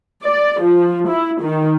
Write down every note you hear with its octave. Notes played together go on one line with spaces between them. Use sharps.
D5
F3
E4
D#3